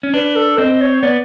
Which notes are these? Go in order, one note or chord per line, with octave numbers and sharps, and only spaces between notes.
C#4
D4 B4
A4
C4 D#5
C#5
B3 D5